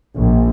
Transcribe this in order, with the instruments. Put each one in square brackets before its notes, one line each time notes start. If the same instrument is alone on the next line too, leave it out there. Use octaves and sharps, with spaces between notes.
[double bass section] A#1